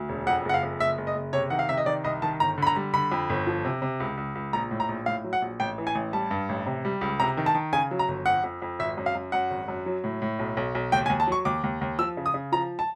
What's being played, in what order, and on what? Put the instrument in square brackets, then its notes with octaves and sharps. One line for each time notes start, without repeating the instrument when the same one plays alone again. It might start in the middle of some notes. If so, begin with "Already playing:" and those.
Already playing: [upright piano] D2
E1
F2 F#5
F#1 F#5
F5
F2
F#1 E5
F#1
D#5
F#1
C3 C#5
D#3 F#5
F5
C3 E5
D#5
D#3 D5
C2 D#5
D#3 A5
G1 A#5
D3 B5
A#5
G3
D3 B5
F2
G1
F3
C3
C3
C#2
C#2
C#2
A#1 A#5
A2
A#5
A#1
A2 F5
F#3
F#5
A#1
A1 G5
E3
G#5
A1
G3 A5
G2
A1
C3
G3
C#2
C3 A#5
D#3
A5
D#3
C#3 G#5
F#3
A#5
G1
F2 F#5
F2
F2
G#1 E5
F#2
F5
F#2
F#2 F#5
G#1
F#2
F#3
A2
A2
B1
B1
B1
D#2 G5
G#5
D#2
A5
F#3 C#6
D#2 D6
D#2
D#2
F3 E6
C#3
D#6
C#3
F3 A#5
A5